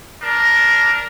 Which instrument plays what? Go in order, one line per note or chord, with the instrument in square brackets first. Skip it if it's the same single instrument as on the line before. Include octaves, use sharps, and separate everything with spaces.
[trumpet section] D4 A#4